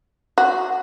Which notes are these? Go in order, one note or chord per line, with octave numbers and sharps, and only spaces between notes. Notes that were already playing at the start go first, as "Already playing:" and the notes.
F#4